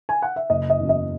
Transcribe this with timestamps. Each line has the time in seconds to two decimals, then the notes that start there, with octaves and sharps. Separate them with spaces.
0.09 G#5
0.22 F#5
0.36 E5
0.50 F#1 D#5
0.70 D#5
0.80 E2 C#3 F#3
0.89 D#5